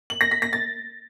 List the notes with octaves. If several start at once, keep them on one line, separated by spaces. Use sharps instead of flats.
F#7
A#6
B6
A#6
A6